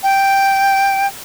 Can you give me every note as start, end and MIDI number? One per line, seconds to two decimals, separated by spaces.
0.03 1.07 79